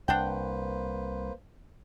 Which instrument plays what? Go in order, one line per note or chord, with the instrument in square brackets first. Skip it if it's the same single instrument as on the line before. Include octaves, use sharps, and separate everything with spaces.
[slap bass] C2 [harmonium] A#3 B4 C5 [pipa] D4 F#5 G5